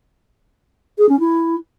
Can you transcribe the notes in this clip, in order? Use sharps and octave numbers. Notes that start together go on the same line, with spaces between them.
G#4
C#4
E4